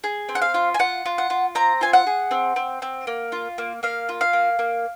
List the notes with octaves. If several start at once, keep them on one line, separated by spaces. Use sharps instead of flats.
G#4
C4
F#5
F5
F4
G#5
F4 F#5
F4
F#5
F4
C4 A#5
F4 G#5
F#5
G#4
C4
C4
C4
A#3
F4
A#3
A#3 F5
F4
F5
A#3
A#3